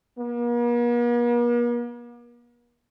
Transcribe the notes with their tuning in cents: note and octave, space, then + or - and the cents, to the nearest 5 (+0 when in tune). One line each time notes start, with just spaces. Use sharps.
A#3 +45